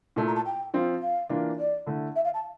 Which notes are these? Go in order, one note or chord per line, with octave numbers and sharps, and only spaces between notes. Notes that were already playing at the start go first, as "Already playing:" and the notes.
A#2 A3 E4 A5
A#5
A5
G5
F3 C4 F4
F5
E3 A#3 D4 F4
D5
D3 A3 E4
E5
F5
A5